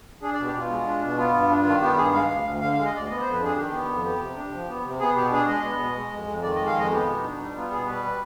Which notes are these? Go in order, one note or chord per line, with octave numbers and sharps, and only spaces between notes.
D4 G#4
D5
B2
G4
B2 F4
G#3
D4
B2
B3 F4
G2
D4
D#3 F4
B3 G4
G2 G#4
G#3 F5
D2
D2
D3 F5
F5
G#3
D#5
D2 D5
B3 D#5
C5
F2
B4
D4 G#4
D#3 G4
B3
F2
B3 G4
C3
D4
F3
B3
C3
B3 G#4
B2 G4
D4 G#4
G#3 D#5
B3
B2
G#3
F2
F2
D#3 D5
D#5
G#3
F5
F2 D#5
B3 G4
B2
D#4
D4
G3 D#4
B3 F4
B2 G#4
G3 B4